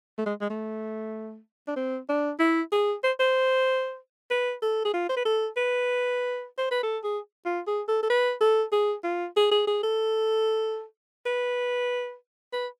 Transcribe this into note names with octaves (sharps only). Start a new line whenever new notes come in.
A3
G#3
G#3
A3
D4
C4
D4
E4
G#4
C5
C5
B4
A4
G#4
F4
C5
B4
A4
B4
C5
B4
A4
G#4
F4
G#4
A4
A4
B4
A4
G#4
F4
G#4
G#4
G#4
A4
B4
B4